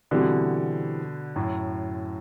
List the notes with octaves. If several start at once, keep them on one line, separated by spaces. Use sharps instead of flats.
B2 D3 E3 G3 C4 F#4
F#2 A2